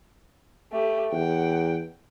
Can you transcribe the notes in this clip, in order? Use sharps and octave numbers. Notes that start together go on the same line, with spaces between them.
A3 G4
E2 F#5 G5